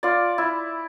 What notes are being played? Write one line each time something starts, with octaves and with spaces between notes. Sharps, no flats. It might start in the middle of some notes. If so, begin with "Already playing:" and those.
F4 D5
E4